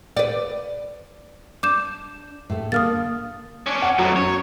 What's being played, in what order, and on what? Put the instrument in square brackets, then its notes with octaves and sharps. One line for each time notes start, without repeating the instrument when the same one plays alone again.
[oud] B4 D5
[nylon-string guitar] D4 [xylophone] D6 G6 E7
[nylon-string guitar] A2 A3
[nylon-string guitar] D3 A#3 [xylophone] D#6 F6 A6
[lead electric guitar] C#4 D4
[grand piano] F#5
[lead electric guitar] F2 A2 [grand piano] F#3
[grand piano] F#2 [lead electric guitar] C#5